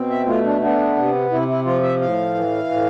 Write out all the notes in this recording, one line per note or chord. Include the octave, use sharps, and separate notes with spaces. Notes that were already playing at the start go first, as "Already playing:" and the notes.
Already playing: B2 C4
E5
A3 F4
D4
B3 D4
C3
C3 E4
E4
F3 F4
E5
A2 F5
E3
A2